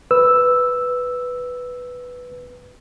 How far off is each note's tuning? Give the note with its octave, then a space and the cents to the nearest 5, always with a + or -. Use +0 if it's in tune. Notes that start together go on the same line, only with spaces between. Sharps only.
B4 +0 E6 +0